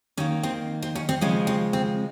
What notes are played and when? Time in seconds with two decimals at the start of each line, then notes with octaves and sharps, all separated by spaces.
0.17 D#3 A#3 C#4
0.43 C4
0.82 C4
0.95 C#4
1.09 C4
1.21 C#3 F3 G#3 C#4
1.47 C4
1.73 C4